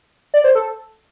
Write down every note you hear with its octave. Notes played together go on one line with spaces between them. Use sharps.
D5
C5
A4